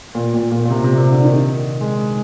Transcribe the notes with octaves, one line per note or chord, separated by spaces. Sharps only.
A#2
A#2
A#2
A#2
C3
C3
C3
D3
D#3
G#3